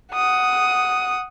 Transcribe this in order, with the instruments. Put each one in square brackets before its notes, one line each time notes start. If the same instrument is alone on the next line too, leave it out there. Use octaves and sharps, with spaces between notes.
[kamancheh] F#5 D#6